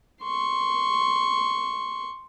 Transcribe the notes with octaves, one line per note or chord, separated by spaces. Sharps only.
C6 C#6